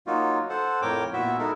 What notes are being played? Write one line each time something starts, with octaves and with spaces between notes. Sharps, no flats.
F#3 A#3 D#4 F4 F#4
A4 C5 F#5
F2 A2 A#4 C#5 G5 D6
A#2 B3 E4 F#4 E5
G#3 D#4 E4 A4 A#4